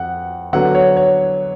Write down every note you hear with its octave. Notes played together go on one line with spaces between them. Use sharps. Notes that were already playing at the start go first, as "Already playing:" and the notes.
Already playing: F2 F#5
D3 F#3 B3 F#5
C#5
C#5